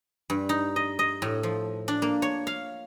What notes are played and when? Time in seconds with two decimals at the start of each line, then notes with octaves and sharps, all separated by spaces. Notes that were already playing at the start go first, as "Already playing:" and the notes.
0.30 G2
0.49 D#4
0.76 D#5
0.99 D#5
1.22 A2
1.43 F3
1.88 D4
2.02 A#3
2.22 C#5
2.47 F5